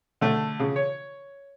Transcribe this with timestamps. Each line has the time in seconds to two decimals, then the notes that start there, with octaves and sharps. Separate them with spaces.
0.21 D3 A3
0.59 C#3
0.76 C#5